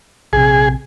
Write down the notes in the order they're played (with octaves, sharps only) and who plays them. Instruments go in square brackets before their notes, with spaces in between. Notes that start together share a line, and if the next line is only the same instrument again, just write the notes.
[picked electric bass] A#1 C3 [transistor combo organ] G#4